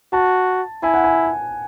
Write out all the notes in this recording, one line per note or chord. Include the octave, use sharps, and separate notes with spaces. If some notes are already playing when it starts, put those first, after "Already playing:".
F#4 A5
E4 G#5
F#5
G#5